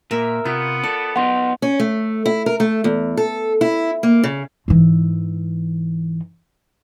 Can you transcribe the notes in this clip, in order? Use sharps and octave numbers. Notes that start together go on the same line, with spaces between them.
A#2 A#4 E5
C3 B3 F4
A4 D5
B3 D#4 F#5 C6
C#4
A3
E4
A#4
A3
E2
A4
E4
A#3
C#3
G#2 E3